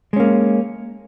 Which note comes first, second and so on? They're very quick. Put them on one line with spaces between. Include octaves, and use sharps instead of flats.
G#3 C#4 A#3